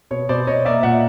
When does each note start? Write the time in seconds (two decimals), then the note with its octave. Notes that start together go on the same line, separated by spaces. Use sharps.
0.11 B2 C#5
0.29 B2 C5 D5
0.47 B2 C#5 D#5
0.65 A#3 D5 E5
0.83 A#2 E5 F#5